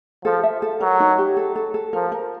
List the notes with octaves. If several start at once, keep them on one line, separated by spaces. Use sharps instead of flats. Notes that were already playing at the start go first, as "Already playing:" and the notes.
F3 A4
E5
A4
F#3 A#4
D#4
G4
A4
A4
A4
F3 A#4
A#4